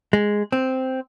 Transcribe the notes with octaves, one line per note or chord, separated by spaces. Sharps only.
G#3
C4